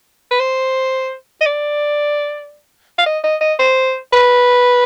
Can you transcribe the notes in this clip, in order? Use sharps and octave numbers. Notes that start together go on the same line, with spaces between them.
B4
C5
D#5
D5
F5
D#5
D#5
D#5
C5
B4